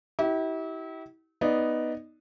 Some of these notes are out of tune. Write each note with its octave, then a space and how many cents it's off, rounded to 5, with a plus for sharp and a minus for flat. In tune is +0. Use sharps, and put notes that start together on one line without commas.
E4 -35 G4 -35
B3 +0 D#4 +0 D5 +0